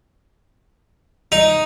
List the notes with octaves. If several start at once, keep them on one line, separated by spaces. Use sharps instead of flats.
D#4